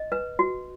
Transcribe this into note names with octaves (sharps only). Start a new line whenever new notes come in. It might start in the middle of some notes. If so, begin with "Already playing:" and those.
Already playing: D#5
B4
F#4